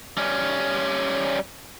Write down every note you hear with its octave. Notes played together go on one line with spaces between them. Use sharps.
G3 C#4